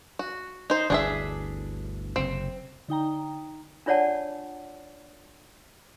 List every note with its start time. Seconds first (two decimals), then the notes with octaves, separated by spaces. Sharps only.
0.19 F#4
0.70 D#4 C5
0.90 G1 D2 E3 D4 G#4 E5
2.16 F#1 C3 C4
2.88 D3 D#4 G5 A#5
3.86 D4 F4 C#5 D5 F#5 A5